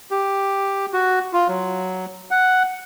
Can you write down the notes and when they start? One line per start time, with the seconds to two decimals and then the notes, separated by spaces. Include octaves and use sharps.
0.11 G4
0.93 F#4
1.33 F4
1.48 F#3
2.31 F#5